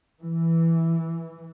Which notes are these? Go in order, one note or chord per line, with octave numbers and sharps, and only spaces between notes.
E3